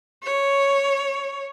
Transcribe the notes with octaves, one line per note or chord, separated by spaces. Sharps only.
C#5